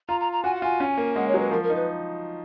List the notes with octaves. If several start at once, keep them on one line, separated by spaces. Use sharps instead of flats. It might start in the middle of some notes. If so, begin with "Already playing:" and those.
F4 A#5
A#5
A#5
F#4 G#5
F#5
F4 G#5
C#4
A#3
G#3 F#5
C#5
F#3
B4
F3 A#4
A#4
D#4
B4